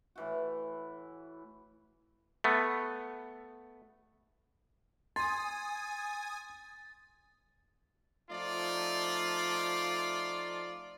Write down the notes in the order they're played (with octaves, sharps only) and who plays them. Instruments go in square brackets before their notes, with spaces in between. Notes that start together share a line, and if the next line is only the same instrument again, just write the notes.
[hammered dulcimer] A2 E3 F#4
[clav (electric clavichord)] A3 B3
[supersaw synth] G#5 D#6 [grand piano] C6 [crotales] A6
[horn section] F3 A3 D#4 F4 D5